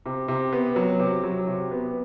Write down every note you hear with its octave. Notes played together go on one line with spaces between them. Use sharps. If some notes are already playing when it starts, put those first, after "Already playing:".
C3
C3
B3
F#3
C3
F#3
C3
B3